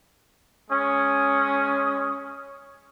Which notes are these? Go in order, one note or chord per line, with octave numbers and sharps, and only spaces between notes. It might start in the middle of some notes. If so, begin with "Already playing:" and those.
G#3 C#4 D#6